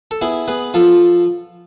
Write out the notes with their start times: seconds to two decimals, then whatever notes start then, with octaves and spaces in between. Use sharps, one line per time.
0.11 A4
0.21 B3 E4 G#4
0.48 B3 G#4 B4
0.74 F3 F4 A4